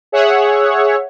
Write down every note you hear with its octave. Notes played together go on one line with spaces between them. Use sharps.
G#4 C#5 E5 F#5